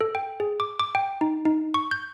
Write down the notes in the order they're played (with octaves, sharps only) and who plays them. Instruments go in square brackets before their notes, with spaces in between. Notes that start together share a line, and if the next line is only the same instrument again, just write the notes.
[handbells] A4
G5
G#4
D6
D6
G5
D#4
D#4
C#6
G6